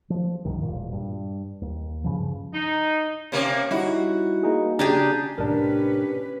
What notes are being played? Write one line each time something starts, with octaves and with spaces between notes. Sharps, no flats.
F3
C2 G2 D#3
E1 A#1 A#2
G2
D#2
G2 C#3 F3
D#4
C3 A#3 C#4
G3 D#4 E4 F#4
A#3 D#4 G#4
C#3 D4 G4 G#4 A#5
A2 C3 C#4 D4 G4 A#4 B4